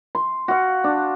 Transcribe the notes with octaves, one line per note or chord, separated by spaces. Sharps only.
C6
F#4 F5
D4